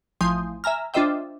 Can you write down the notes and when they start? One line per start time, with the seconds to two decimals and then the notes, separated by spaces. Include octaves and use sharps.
0.21 A1 F3 G#5 C6 D#6 G6
0.64 E5 G#5 A#5 F6
0.94 D4 F4 C5 D#5 E5 G5